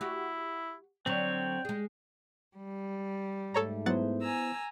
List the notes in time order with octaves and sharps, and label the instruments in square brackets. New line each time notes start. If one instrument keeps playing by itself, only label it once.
[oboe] E4 [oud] F#4 G4
[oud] D3 F#3 [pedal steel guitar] C4 C#5 [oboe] G5
[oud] G#3 G#4
[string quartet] G3
[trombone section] G#2 A3 [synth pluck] A4 C#5 A#5
[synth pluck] F#3 F#5 A6 [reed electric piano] B3 E4 C5
[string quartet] G#5 A#5 E6